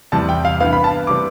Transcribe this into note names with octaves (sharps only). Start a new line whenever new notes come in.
E2 C3 E3 G3 A5
G5
F5
G2 E3 B3 F5
B5
A5
C3 G3 B3 D6